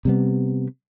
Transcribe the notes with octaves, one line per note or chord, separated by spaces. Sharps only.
C3 G3 B3